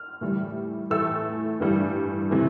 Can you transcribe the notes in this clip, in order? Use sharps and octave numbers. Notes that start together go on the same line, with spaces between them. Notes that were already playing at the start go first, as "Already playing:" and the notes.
Already playing: F6
A2 E3 G3
A2 E3 A3 E6
G2 E3 G3
C3 E3 A3